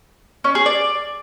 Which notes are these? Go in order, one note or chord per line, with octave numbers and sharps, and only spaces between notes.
C#4
G#4
D5